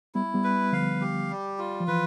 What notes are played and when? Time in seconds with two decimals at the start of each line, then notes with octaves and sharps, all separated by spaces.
0.15 G3 B3 E4
0.34 G3 B3
0.44 B4
0.73 D3 F3 F5
1.01 G4
1.30 G3
1.58 F4
1.80 F3
1.88 E3 B4